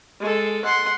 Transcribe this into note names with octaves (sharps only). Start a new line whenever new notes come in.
G#3 A4
F#5 C6